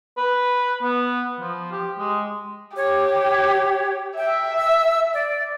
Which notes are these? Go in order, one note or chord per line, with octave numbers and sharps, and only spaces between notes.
B4
B3
F3
G4
G#3
G4 C#5
E5 G5
E6
D5